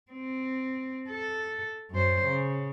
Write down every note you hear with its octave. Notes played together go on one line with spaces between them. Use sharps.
C4
A4
F#2 C5
C#3